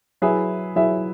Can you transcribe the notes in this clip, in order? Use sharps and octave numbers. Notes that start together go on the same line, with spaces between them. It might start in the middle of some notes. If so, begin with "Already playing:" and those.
F#3 E4 G#4 B4 E5
F#3 E4 G#4 B4 E5